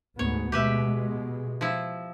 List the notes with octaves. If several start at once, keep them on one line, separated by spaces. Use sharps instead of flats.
D2 G#2 B3 C#5
B2 G#3 G4 B4 E5
F3 E4